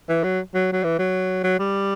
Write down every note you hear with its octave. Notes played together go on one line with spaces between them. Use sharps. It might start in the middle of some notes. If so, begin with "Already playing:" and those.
E3
F#3
F#3
F#3
E3
F#3
F#3
G3